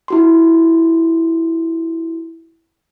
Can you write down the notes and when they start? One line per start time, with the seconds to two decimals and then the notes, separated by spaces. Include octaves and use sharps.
0.08 E4 F#4 C6